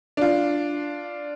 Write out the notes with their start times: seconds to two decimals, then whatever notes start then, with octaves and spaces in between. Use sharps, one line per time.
0.17 D4 F4